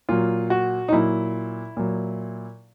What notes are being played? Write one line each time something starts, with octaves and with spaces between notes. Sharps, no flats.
A#2 F#3 F4
F#4
D#4
A#2 F#3 E4
A#2 F#3